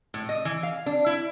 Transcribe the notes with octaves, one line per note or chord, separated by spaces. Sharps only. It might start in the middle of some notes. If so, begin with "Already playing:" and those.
A2
D#5
E3
F5
D4
E4